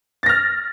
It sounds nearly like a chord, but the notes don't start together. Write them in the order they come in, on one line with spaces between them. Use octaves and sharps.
A6 A#6 F6